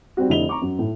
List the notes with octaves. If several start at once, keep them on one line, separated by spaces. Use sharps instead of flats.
G3 C4 F#4
F1 D3 E4 D#5 F7 G7
A#5 C#6 D6
F#2
A2